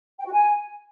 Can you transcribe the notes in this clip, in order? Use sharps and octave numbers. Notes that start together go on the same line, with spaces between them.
G5
F#4
G#5